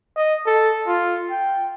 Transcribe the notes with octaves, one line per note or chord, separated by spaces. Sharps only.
D#5
A4
F4
G5